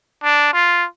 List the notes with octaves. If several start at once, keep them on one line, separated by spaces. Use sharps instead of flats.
D4
F4